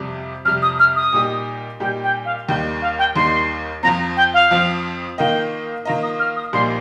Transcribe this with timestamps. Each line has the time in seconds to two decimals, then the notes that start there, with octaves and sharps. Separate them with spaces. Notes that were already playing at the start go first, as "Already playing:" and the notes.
Already playing: F2 C3 G3
0.45 F2 C3 G3 F6
0.62 D#6
0.79 F6
0.96 D#6
1.13 A#2 G3 D#4 G4
1.80 A#2 G3 D#4 G4 G5
2.03 G5
2.25 F5
2.48 D#2 D#3 G3 D#4 G5
2.82 F5
2.99 G5
3.16 D#2 D#3 G3 D#4 C6
3.83 F2 F3 C4 A#5
4.17 G5
4.34 F5
4.51 F2 F3 C4
5.18 D#3 A#3 F4 D#5 G5
5.85 D#3 A#3 F4 D#5 A#5
6.03 D#6
6.19 F6
6.36 D#6
6.53 A#1 A#2 G3 A#3 D#4 C6